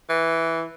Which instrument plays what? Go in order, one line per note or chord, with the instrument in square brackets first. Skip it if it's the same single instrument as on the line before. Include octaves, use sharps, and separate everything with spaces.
[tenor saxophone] E3